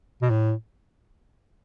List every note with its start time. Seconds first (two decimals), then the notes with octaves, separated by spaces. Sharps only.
0.22 B2
0.30 A2